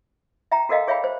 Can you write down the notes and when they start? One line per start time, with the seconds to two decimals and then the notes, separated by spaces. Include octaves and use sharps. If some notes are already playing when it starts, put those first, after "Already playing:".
0.52 E5 G5 A#5
0.69 F#4 A4 A#4 D#5 F5 G5
0.87 G#4 C#5 E5 F5 G5 B5
1.04 C5